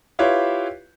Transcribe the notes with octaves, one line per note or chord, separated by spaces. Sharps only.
E4 F4 G4 B4 C#5